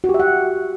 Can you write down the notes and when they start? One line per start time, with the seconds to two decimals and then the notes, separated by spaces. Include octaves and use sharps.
0.04 F#4
0.09 G4
0.14 E5
0.20 F#5